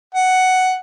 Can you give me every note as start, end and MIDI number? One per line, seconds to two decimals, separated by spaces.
0.15 0.78 78